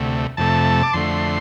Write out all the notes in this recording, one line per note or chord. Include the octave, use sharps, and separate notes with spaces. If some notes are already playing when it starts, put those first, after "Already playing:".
Already playing: D2 C3 A3
F2 C3 A3 A5
D6
F2 D3 A3 C6